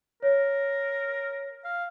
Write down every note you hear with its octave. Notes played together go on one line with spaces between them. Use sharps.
A#4 C#5
F5